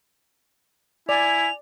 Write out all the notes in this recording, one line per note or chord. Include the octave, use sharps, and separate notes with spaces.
E4 D5 G#5 F7